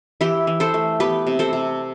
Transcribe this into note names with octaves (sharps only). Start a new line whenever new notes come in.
E3 E4 G4
E3
A4 C5
A3
B3 G4 B4
C3
A4 C5
C3